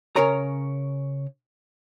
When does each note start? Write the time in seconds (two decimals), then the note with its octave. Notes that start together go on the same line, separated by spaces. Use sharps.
0.16 C#3 C#4 A#4 C#5 A#5